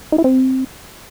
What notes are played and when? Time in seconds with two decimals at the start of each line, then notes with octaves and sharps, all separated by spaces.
0.12 D#4
0.18 E4
0.24 C4